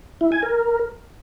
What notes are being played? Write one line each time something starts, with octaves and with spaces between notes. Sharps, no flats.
E4
G#5
A#4